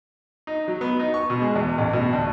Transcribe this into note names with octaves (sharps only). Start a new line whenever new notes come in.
D#4
F#3
B3
D#4
C#6
B2
G#3
E2
A1
B2
D2